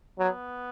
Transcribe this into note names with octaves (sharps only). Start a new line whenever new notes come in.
F#3 B3